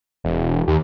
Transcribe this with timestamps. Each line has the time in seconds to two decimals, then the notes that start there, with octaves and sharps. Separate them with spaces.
0.24 E1
0.67 D#2